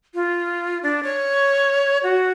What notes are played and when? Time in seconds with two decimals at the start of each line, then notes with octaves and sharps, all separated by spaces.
0.15 F4
0.83 D4
1.03 C#5
2.03 F#4